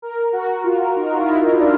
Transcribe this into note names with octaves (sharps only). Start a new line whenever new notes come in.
A#4
F#4
F4
D#4
F#4
F4
E4
D#4
D4